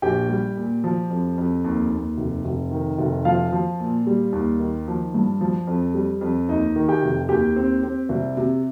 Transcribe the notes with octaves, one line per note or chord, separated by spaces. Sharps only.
A#1 G4 G5
G3
A#2
F3
F2
F2
D#2
D#2
F1
F1
D#3
F1
F3 F4 F5
F3
A#2
G3
D#2
D#3
F3
G2
F3
F2
G3
F2
D#2 D#4 D#5
D#3
G4 G5
F1
D#2 G4 G5
C4
C4
C2
C3